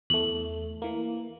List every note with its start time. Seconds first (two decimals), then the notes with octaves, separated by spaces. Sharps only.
0.10 E2 A3 F#7
0.82 E3 A#3